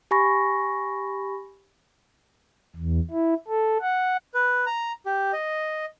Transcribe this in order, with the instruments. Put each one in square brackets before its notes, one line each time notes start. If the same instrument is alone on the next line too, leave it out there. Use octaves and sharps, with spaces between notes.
[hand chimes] G4 G#5 B5 C#6 A#6
[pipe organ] E2
E4
A4
F#5
[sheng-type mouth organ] B4
A#5
G4
D#5